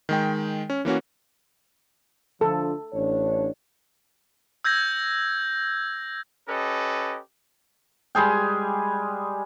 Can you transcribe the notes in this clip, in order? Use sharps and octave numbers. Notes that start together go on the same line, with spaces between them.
D#3 G#3 G5
C#4
E3 A#3 C#4 F#4
D3 F3 A4
A1 D4 C#5
E6 G6 G#6 A#6
C#4 G4 A4 B4 D#5
G3 G#3 G#4 G5